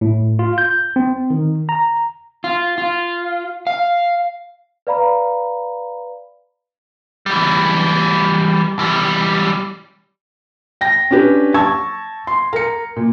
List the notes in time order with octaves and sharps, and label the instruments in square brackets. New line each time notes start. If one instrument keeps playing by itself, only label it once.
[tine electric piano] A2
F4
G6
C4
D#3
A#5
[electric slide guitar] F4
F4
F5
[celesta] B4 D5 F5 A#5 B5
[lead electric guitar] E3 G3
E3 G3
[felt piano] G5 A#6
C#4 D4 G4 B4
A5 C#6 E6 G#6
C6
A#4 C#7
A#2